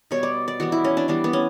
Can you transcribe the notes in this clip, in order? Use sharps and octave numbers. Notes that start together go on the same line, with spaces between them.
B2 G3 B3 C#5
D5
D5
E3 G3 B3 F#4
E4
C#4
D4
E3 G3 B3 D4
B3
C#4